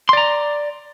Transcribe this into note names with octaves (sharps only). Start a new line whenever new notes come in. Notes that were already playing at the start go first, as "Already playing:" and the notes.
D5 A#5 C6